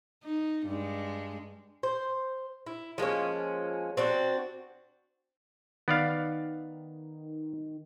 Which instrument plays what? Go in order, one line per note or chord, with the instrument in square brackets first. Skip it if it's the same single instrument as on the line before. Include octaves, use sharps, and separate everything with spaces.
[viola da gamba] D#4
G2 G#3
[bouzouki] C5
E4
F3 G#3 A#3 C#4
C4 D4 F#4
[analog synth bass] D#3 [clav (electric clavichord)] B3 D5 F5